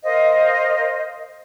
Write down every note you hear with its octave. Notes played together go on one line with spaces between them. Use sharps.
A#4 C5 D#5 F5